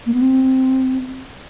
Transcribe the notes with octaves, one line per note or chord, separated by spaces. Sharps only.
A#3
B3
C4